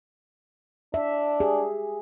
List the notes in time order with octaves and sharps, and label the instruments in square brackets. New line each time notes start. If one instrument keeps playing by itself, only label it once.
[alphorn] D4 [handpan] E5
[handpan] G4 G#4